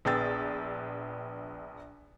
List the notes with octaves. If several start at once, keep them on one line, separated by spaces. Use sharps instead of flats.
A#1 B3 G#4 G5 E6 A6